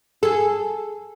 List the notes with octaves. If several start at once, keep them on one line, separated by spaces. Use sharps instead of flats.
G#4 A4